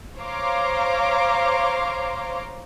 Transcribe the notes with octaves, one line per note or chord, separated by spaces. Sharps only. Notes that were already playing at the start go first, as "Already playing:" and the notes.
C5 C#5 F5 A#5 C6 D6